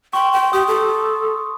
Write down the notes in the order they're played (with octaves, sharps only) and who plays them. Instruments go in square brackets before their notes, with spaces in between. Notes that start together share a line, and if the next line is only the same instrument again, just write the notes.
[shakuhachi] G5 [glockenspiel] C6 C#6
[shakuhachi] G5
[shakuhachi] G4 [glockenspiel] D#6
[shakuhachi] A4